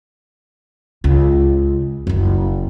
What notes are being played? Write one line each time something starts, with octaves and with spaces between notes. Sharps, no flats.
C#2
F#1 F#2